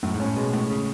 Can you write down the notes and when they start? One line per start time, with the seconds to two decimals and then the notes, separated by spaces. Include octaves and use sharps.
0.03 F#2 A2
0.14 G#2
0.20 C#4
0.25 A2
0.36 B2 G#3
0.53 A2
0.70 C#3